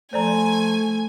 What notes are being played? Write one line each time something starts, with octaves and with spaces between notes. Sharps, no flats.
F3 A3 C5 D5 G#5 A#5